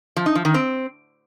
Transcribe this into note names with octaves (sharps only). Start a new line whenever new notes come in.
F3
D#4
F3
D#3
C4